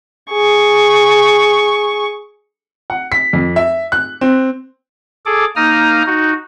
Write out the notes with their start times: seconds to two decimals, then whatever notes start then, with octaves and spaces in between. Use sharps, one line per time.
0.32 G#4 C#6
2.90 F#5
3.12 B6
3.33 F2
3.56 E5
3.92 F#6
4.21 C4
5.26 G#4 A4 D6
5.56 A#3 D#4 A#5 D#6 F6
6.07 D#4 F#4